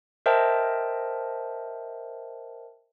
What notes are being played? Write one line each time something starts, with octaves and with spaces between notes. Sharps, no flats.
A#4 C5 D#5 E5 G5 A5